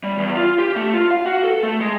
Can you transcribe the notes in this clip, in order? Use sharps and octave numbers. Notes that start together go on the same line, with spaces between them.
G3
E2
F4
G4
A3
F4
F5
F#4
A4
A3
G#3